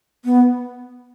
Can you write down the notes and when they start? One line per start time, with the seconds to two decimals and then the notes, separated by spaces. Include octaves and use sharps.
0.25 B3